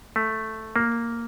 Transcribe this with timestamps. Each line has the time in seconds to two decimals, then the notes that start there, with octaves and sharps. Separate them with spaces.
0.16 A3
0.76 A#3